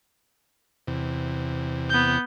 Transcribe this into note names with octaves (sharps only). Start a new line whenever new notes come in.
E2 C3
B3 G6